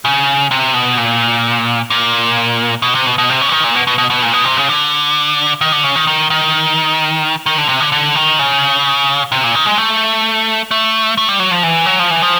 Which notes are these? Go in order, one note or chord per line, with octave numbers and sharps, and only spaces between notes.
C#3
C3
B2
A#2
A#2
B2
C3
B2
B2
C3
C#3
D3
D#3
A#2
B2
B2
B2
B2
A#2
B2
C3
C#3
D3
D#3
D3
C#3
D#3
D#3
D#3
D#3
D3
C3
D3
D3
D#3
C#3
C3
A#2
D#3
G#3
A3
A3
A3
G3
F#3
F3
E3
F#3
F3
E3
F3